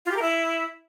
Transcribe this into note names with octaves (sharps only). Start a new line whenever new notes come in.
F4
G4
A#4
E4